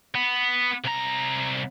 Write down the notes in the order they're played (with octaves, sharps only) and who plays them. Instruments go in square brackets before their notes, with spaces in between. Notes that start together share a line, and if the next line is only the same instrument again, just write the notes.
[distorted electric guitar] B3
C2 A#5